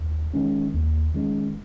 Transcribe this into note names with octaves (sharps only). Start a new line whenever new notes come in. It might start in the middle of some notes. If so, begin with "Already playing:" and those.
Already playing: D#2
D#3 G#3 C#4
D#2
D#3 G#3 C#4